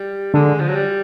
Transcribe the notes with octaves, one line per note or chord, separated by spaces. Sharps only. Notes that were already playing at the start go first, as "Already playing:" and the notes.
Already playing: G3
D3 G#3
F3
F#3
G3